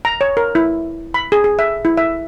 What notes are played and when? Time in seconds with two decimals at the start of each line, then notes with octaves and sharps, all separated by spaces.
0.05 A#5
0.21 C#5
0.37 A#4
0.55 E4
1.14 B5
1.32 G#4
1.44 G#4
1.59 E5
1.85 E4
1.97 E5